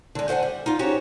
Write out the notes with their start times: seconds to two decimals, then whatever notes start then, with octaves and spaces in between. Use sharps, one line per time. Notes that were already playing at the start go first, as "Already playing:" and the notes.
0.15 D3 G#3
0.28 A3 C5 F5 F#5 G#5
0.43 G3
0.66 D#4 F4
0.79 C#4 F#4 G4 C5 C#5